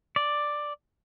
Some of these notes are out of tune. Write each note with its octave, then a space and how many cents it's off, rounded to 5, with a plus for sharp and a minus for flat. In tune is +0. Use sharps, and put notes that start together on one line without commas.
D5 +5